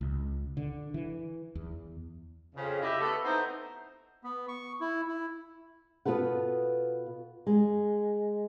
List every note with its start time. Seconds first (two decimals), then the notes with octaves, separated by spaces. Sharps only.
0.01 C#2
0.57 D3
0.94 E3
1.55 E2
2.55 F2 C#3
2.82 E4 G4 D#5 E5
3.00 A3 B3 A4
3.23 B3 C4 D#4 E4 C5
4.24 B3
4.48 C#6
4.81 E4
5.07 E4
6.05 B2 B3 F4 A4 B4 F#5
7.47 G#3